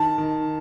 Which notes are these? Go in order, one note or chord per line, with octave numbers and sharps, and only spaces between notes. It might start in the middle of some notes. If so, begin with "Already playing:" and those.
Already playing: D#3 A5
D#3